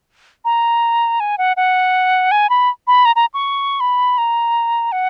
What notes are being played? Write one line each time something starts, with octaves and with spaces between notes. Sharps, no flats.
A#5
G#5
F#5
F#5
G#5
B5
B5
A#5
A#5
C#6
B5
A#5
F#5